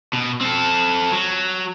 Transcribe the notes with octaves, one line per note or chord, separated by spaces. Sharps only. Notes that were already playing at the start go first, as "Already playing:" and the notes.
B2
C4 A4
F#3